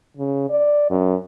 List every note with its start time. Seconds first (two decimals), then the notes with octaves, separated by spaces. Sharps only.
0.17 C#3
0.50 D5
0.90 F#2